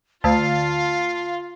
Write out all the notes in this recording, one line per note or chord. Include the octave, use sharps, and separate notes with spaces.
D2 F4 F5 A5